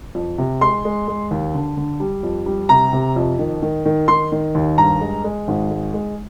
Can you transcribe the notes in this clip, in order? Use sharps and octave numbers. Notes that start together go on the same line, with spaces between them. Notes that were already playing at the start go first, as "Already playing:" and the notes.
F2
C3
G#3 C6
G#3
G#3
D#2
D3
D3
G3
F2
G3
C3 A#5
C3
F2
D#3
D#3
D#3
D#3 C6
D#3
D#2
G2 A#5
G#3
G#3
G#1
G#3
G#3